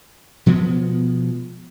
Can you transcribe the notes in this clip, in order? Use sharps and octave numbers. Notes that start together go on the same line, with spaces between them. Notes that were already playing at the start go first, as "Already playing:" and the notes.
B2 F3 G#3 B3